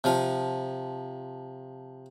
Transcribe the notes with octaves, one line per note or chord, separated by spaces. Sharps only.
C3 F3 F5